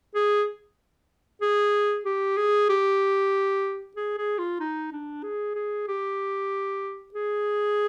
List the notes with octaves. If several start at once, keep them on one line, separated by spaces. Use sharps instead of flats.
G#4
G#4
G4
G#4
G4
G#4
G#4
F4
D#4
D4
G#4
G#4
G4
G#4